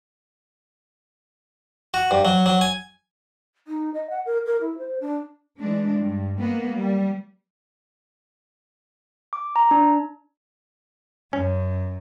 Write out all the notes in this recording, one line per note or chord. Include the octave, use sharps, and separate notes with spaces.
F#4
G2
F#3
F#3
G#5
D#4
D#5
F#5
A#4
A#4
E4
C5
D4
E3 G#3 D4
G2
G#3 A#3 B3
G3
D6
A#5
D4
F#2 C#4